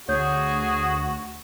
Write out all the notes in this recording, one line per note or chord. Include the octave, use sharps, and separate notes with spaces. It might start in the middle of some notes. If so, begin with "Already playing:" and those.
D2 F#4 G#4 C#5 G6